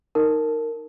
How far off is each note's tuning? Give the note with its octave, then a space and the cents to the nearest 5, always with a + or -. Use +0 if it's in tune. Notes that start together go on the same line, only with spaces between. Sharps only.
D#4 +0 A#4 -15